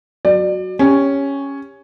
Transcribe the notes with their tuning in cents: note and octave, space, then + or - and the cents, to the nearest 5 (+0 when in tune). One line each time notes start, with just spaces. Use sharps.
F#3 +0 D5 +30
C#4 +0 G4 +25